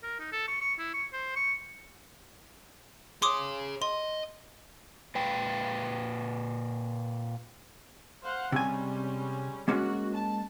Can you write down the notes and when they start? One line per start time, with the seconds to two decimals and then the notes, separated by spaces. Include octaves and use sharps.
0.03 A#4
0.20 D#4
0.32 A4
0.48 C#6
0.61 C#6
0.79 E4
0.94 C#6
1.13 C5
1.36 C#6
3.22 G#4 C#5 C6 D6 D#6
3.82 D#5 C6
5.15 A#2 B4 G5
8.22 C5 F5 F#5
8.52 C3 G3 G#3 C#4 G#5
9.68 G#3 A#3 C#4 F#4
10.14 A5